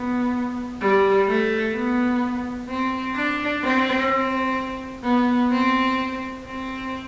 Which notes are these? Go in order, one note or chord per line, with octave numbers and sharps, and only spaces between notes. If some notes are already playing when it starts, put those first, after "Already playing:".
Already playing: B3
G3
A3
B3
C4
D4
C4
C4
B3
C4
C4